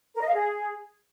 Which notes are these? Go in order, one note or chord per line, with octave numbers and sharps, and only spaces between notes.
A#4
D#5
F5
G#4